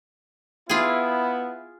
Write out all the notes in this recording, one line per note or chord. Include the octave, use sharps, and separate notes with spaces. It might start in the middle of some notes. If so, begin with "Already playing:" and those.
B3 E4 F4 G#4